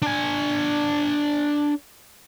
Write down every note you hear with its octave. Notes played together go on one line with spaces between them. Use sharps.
D4 G#5